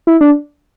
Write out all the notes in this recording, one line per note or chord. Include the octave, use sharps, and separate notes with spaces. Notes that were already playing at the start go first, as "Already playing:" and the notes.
E4
D4